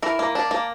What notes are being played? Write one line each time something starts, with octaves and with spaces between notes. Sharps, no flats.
E3 A#4
A#3
D4
A#3